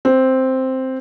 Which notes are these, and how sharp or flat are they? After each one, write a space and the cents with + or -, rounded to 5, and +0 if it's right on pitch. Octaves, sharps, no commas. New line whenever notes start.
C4 +0